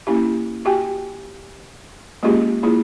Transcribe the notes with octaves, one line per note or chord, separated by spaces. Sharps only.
A#3 C#4 E4 G4
F#4 G4 G5 G#5
G#3 A#3 C#4 F4 G4 G#4
A#3 E4 F4 G#4